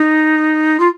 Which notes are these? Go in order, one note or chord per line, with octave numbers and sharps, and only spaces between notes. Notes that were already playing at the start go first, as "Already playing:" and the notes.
Already playing: D#4
F4